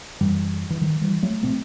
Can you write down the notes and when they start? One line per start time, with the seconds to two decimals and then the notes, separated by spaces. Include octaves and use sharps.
0.21 F#2 E3 G3
0.70 E3
0.81 D#3 F#3
1.01 E3 G3
1.22 F#3 A3
1.43 B2 A3 C4